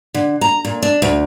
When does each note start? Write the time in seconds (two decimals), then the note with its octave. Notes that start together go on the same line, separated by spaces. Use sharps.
0.14 D3
0.41 A#5
0.65 A#2
0.82 D4
1.02 D2